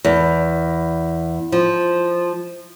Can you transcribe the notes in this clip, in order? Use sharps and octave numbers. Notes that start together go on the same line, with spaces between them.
E2
F3